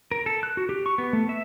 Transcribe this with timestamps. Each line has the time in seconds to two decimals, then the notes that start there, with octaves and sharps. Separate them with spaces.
0.11 A#4
0.26 A4
0.43 F#6
0.57 F#4
0.69 G4
0.86 C#6
0.98 B3
1.13 A3
1.29 E5